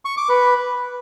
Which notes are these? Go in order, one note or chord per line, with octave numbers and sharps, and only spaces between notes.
C#6
D6
B4